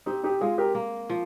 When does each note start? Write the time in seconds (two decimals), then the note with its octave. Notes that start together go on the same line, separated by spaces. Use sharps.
0.06 C4 D#4 G4
0.23 D#4 G4
0.41 G#3 F4 G#4
0.58 G4 A#4
0.75 A#3
1.10 F3